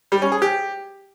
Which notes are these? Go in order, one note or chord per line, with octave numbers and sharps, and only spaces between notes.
G3
C#4
G#4
G4